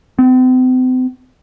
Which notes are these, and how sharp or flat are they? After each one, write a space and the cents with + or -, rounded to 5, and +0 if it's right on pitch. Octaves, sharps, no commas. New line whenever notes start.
C4 -40